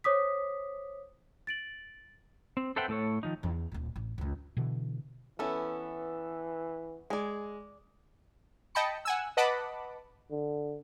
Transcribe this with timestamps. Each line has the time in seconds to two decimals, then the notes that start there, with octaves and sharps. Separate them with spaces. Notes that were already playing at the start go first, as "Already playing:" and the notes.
0.04 C5 C#5 D6 D#6 B6
1.47 A6 D7 F#7
2.57 C4
2.76 A4 B4 C5 E5 F#5 G5
2.88 A2 A3 A4 C#5
3.23 D#3 F3 D#4
3.43 E2
3.72 D1 A#2
3.96 A1
4.18 C#2 F#2
4.57 B2 D3 E3
5.39 E3 B3 C#4 E4 A4
7.10 G#3 D5 G#5
8.75 D#5 G5 A5 B5 C#7
9.05 F#5 G#5 E6
9.37 B4 D#5 F#5 A5 B5 D6
10.31 D3